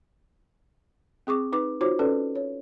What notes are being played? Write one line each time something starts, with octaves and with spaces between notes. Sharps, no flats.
C4 G#4 C#6 D6
D#4 B4 D6
D#4 F4 F#4 C5 C#5 D6
C#4 A4 B4 D5
C#5